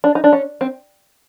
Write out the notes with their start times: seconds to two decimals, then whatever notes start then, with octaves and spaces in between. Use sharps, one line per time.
0.04 D4
0.15 D#4
0.24 D4
0.33 C#4
0.61 C4